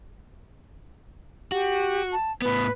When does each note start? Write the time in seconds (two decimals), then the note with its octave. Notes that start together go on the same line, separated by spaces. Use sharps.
1.52 F#4 G4
2.12 A5
2.42 A2 B3 B4